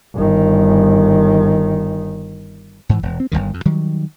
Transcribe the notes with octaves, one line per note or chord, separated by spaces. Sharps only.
G1 D#3
G#2 E3
E1
C4
G1 C2 G2 D#3
F2
D#3 F#3 G3